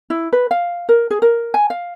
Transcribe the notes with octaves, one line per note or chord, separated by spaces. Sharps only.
E4
B4
F5
A#4
G#4
A#4
G#5
F5